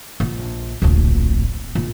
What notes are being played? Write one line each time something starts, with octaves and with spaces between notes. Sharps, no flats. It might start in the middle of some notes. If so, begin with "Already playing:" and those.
A#1
D1 A#1
A#1